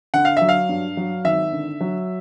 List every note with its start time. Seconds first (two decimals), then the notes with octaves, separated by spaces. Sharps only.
0.14 D3 F#5
0.25 F5
0.37 F#3 E5
0.49 F5
0.69 G2
0.97 F#3
1.25 G#1 E5
1.52 D3
1.81 F#3